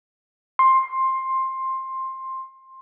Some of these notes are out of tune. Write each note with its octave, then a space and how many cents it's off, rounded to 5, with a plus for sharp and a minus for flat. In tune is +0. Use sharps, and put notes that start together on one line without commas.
C6 +15